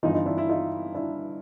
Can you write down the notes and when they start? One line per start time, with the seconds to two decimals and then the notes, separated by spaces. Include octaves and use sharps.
0.03 G1 G2 E3 D#4 F4
0.14 D#4 F4
0.26 D4 E4
0.37 D4 E4
0.49 D#4 F4
0.95 D4 E4